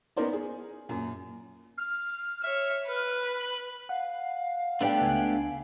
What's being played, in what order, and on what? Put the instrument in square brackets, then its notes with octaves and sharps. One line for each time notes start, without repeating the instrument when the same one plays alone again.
[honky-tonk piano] B3 C#4 D#4 A#4 C5 D5
G#4
F#2 A#2
[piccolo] F6
[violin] C#5 E5 [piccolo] F6
[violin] B4
[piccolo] F#7
[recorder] F5 [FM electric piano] F#5
[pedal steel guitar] A3 B3 G4 [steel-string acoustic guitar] D4 D5 G5
[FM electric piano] C#2 G#5